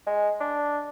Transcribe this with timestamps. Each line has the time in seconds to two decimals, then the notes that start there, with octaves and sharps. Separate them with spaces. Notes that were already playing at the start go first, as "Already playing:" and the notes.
0.07 G#3
0.40 D4